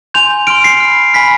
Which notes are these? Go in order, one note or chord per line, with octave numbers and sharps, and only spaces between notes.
G#5 C6 G6 F7
C6 F6 D7
C7
B5 F6
G#5 B5 F6 B6